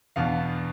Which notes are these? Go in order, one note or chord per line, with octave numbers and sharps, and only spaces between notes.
E2 B2 B3 D4 F5